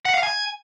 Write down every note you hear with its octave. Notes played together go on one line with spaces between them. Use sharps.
F#5
F5
G#5